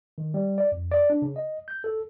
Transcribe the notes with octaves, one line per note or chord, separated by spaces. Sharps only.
D#3
G3
D5
F2
D5
D4
C#3
D#5
G6
A4